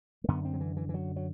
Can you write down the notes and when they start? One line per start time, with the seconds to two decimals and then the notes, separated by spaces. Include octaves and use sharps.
0.24 A3
0.28 F#2 D3 B3
0.45 C4
0.54 F#3
0.61 E3
0.77 E3
0.89 E3
0.94 F#3
1.16 F#3